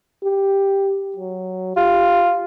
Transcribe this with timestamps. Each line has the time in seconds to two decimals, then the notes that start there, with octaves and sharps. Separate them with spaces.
0.24 G4
1.17 F#3
1.77 F4 G4